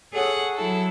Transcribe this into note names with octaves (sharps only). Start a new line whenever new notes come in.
G#4 A4 C#5 F#5
F#3 E4 A4